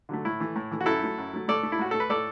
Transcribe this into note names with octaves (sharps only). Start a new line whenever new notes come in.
D3 F#3 A3
A2 E4
E3 A3
A2
E3 A3
F#4
F#2 E4 A4
F#3 A3
F#2
F#3 A3
A2 A4 D5
A3
E4
A2 F#4
A3 A4
B4
A2 A4 D5